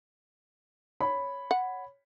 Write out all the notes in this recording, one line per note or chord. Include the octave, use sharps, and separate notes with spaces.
C#5 B5
F#5